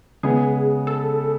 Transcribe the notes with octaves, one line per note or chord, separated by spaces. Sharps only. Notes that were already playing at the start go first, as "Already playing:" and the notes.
C#3 G#3 B3 G#4
A4